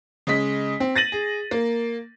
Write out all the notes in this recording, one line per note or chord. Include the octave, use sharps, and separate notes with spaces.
C#3 G#3 D#5 B6
C4
A6 A#6 D#7 F#7
G#4
A#3